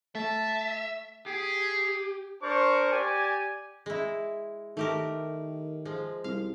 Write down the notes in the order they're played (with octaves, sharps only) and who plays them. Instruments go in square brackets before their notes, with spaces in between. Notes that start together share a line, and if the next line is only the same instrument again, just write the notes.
[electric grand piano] A3 [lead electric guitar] E5 [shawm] A5
[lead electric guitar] G4 [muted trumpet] G#4
[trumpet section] D4 A#4 C5 C#6
G4 D5 G#5
[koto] G#3 E4
[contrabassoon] D#3 [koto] A3 G4 A#4
[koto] F3 G#3
[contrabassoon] C2 [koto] F5